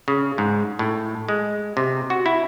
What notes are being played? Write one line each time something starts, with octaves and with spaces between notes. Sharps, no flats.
C#3
G#2
A2
G#3
C3
F#4
E4